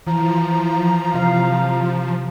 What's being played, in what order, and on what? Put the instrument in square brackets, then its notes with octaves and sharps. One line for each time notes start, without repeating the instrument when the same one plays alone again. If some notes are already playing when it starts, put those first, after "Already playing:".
[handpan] E3 [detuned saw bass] F3 [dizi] A#5
[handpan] C3 F4 F5